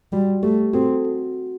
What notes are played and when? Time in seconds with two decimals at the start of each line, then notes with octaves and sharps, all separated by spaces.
0.13 G3 F#4
0.43 A3 G4
0.73 C4 F#4 A4
1.05 F#4